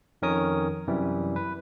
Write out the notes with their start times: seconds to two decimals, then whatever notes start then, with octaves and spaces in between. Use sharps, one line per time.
0.22 F2 D#3 C#4 A#4 C#5 D#6
0.87 F#2 C3 E3 G3
1.36 B4